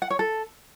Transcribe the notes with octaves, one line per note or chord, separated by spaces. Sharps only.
F#5
C#5
A4